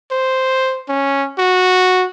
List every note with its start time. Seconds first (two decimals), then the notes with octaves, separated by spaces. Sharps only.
0.11 C5
0.89 C#4
1.38 F#4